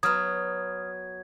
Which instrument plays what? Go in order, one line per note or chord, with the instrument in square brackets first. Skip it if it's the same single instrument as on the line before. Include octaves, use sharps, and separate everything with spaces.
[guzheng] F#3 B3 [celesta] D#6 F6 [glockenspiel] G#6